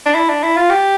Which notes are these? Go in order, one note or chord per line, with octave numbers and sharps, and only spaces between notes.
D4
E4
D4
E4
F4
G4